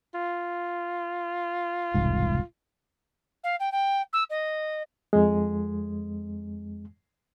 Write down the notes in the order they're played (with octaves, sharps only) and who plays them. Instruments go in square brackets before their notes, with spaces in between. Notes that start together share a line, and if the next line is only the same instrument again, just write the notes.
[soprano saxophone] F4
[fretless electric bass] E1 C2 G#2
[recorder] F5
G5
G5
E6
D#5
[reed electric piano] F2 G#3